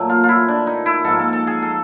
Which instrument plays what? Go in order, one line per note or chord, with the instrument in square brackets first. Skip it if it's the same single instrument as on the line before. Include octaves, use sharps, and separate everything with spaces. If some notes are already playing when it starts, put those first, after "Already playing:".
Already playing: [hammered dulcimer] A#2 F#3 A3
F4
E4 F4
D4
D#4
E4
G#2 F3 A#3 A4
A4
A4
G#4
A4